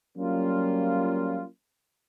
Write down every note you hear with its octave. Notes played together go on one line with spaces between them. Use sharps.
F#3 G3 A#3 C#4 F4